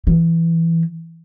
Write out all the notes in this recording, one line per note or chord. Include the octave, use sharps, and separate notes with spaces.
E3